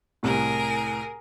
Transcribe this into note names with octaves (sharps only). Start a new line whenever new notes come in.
C2 A2 G#4 A#4